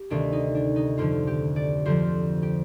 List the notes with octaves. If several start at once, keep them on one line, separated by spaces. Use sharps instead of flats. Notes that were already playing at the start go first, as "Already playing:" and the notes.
Already playing: G4
D2 C3 D#3 D4
D#4
D4
D#4
F2 D3 F3 F4
G4
D5
F2 D3 F3 C5
G4